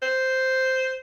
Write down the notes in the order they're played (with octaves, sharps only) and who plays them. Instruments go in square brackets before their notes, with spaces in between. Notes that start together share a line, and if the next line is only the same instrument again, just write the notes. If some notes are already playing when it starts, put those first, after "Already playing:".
[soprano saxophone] C5